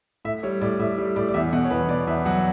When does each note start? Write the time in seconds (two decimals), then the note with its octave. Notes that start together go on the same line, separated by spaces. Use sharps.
0.25 A2 E5
0.43 G3 C#5
0.61 A2 D5
0.79 A2 E5
0.98 G3
1.16 A2 D5
1.29 D5
1.34 E2 E5
1.52 B2 F#5
1.64 C#5
1.71 E2 B4
1.89 B2 D5
2.07 E2 E5
2.26 F#3 F#5